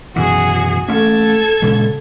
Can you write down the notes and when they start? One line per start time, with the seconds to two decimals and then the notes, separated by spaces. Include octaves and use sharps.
0.16 F#2 B2 E3 F#4 G#4
0.88 A3 A#3 C#4 A4 G#6
1.62 A#2 C#3 G#3